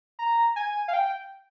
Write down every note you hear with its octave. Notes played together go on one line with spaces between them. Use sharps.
A#5
G#5
F5
G5